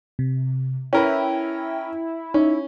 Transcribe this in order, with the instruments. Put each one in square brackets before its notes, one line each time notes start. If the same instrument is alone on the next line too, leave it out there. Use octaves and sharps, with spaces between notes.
[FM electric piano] C3
[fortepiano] C#4 A#4 B4 [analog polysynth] E4 [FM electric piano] G5
[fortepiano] C#4 [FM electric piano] D#4